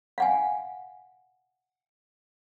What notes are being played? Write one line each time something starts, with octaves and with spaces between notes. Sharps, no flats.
F5 F#5 G#5